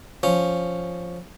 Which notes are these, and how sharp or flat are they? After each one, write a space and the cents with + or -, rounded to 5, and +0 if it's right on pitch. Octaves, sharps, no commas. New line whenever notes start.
F3 +0 C#4 +0